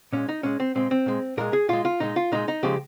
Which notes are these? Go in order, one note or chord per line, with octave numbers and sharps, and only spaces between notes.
A#2 G#3 C#4
D#4
A#2 G#3 C#4
C4
A#2 G#3 C4
C4
A#2 G#3
A#2 G#3 A#4
G#4
A#2 G#3 F4
F4
A#2 G#3 D#4
F4
A#2 G#3 D#4
D#4
C#3 F3 G#3 G4